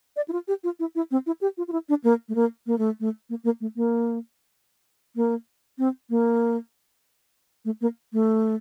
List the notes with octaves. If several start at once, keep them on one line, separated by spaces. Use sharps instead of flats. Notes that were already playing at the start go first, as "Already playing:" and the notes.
D5
E4
F4
G4
F4
E4
E4
C4
E4
G4
F4
F4
E4
D4
A#3
A3
A#3
A#3
A3
A3
A#3
A#3
A3
A#3
A#3
C4
A#3
A3
A#3
A3